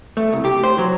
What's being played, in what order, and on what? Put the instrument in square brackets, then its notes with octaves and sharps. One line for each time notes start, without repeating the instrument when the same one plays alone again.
[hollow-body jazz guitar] A3
C2
G4
C5
F#3